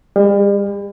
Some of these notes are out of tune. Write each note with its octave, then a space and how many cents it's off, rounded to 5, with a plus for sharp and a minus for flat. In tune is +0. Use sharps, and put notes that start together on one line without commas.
G3 +40 G#4 +0